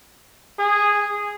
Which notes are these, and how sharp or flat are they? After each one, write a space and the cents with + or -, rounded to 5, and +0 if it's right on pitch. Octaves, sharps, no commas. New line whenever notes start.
G#4 -10